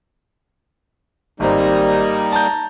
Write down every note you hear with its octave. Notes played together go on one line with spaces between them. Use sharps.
G#1 G3 A#3 C4 D#4
A5 A#5 G6